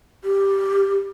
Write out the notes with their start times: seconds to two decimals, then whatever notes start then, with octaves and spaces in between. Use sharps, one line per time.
0.24 G4